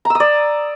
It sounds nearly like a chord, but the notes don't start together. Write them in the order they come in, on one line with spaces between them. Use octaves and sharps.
A#5 E6 D#6 D5